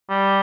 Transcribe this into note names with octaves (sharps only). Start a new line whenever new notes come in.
G3